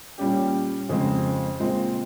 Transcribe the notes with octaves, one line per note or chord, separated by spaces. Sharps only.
A#2 G3 C#4 G4
F2 C#3 F3 G#3 C4
A#2 G#3 C4